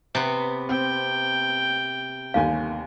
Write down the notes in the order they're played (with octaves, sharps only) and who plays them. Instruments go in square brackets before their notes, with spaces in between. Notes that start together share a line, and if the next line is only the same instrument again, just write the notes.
[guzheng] C3 B3
[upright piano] C4 [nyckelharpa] G5
[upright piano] G1 D#2 G#5 [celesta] F5